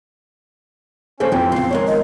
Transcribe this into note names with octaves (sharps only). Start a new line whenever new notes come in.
C#3 F3 A#3 C#4 A4 C5
F2 E3 F3 C4 D#4
C#3 B3 F5 C6
D#3 G#3 A#4 C#5
D#5